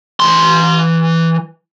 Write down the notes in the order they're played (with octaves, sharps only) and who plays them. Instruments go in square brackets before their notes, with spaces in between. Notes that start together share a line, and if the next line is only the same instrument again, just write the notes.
[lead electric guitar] E3 C6